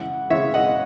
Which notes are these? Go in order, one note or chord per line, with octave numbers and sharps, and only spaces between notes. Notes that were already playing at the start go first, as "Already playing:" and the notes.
Already playing: C#3 E3 G#3 F#5
C#3 E3 G#3 C#5 E5
D#5 F#5